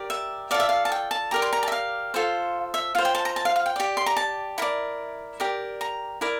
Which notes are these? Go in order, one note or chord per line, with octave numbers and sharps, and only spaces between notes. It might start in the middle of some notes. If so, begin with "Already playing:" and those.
Already playing: G4 A#4 D5
E5
F4 A4 D5 F5
E5
F5
A5
G5
A5
G4 A#4 D5 A#5
C6
A#5
A5
E5
F5
F4 A4 C5
E5
F4 C5 F5
G5
A5
A#5
A5
F5
F5
G5
G4 D5
C6
A#5
A5
E4 A#4 D5
G4 A#4 D5
A#5
E4 A#4 D5